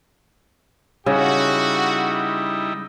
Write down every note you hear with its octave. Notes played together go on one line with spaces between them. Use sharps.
C#3 G3 D#4 E4 F#4